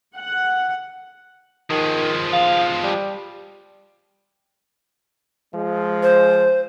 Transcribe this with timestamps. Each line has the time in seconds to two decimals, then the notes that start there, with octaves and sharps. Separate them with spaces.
0.17 F#5
1.70 D#3 F3 G#3
2.33 F5
2.83 G3
5.55 F3 G#3
6.03 C5